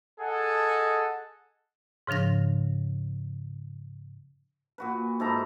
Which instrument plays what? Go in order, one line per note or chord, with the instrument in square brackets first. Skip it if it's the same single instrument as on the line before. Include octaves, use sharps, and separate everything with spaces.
[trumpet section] G#4 A4 D#5 F#5
[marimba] G#2 C#3 F3 D4 A#6
[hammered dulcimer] A#2 F#4 B4
G#2 E4 A4 A#5